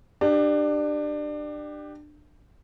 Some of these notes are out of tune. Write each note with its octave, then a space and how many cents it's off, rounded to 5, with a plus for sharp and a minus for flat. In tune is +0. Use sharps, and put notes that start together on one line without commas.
D4 +25 G4 +0